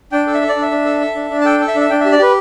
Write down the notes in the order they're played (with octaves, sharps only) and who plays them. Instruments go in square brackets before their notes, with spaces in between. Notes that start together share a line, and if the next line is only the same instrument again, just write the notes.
[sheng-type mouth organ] D4 G5
A4
E5
A4
D5
D4
E5
D4
A4
A4
D4
D4
A5
A4 G5
A4
E5
D4
E5
D4 G5
G4 E5
D5
G4 B4